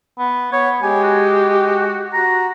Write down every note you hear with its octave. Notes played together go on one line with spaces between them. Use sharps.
B3
B3 C#5
G#3 G4 G#5
F#4
F#4 A#5